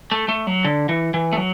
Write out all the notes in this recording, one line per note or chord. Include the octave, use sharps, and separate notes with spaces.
A3
A3
F#3
D3
E3
E3
A3
F#3